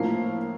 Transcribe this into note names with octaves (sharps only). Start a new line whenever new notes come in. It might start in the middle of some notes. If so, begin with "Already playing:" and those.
Already playing: A2 F3 A#3 C7